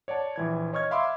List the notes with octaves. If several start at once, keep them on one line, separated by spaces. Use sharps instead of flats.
C#5 D5 F#5 A5
A#1 E3 G#6
C#5 D#5 C#6 F6 G#6
E5 F5 B5 C6 D6 E6